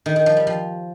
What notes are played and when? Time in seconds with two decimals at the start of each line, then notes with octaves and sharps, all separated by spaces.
0.06 D#3
0.16 D#3
0.26 F3
0.37 G3
0.47 F3